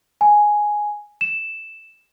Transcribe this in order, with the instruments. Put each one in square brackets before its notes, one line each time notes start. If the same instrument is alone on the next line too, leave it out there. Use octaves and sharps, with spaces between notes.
[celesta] G#5
E7